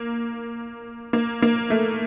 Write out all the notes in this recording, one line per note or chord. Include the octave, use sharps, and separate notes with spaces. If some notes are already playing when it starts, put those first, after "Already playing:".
Already playing: A#3
A#3
A#3
A3